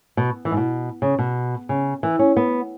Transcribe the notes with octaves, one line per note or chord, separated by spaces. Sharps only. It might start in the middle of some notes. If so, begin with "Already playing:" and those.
B2
E3
G#2
B2
C#3
B2
C#3
E3
C#4
B3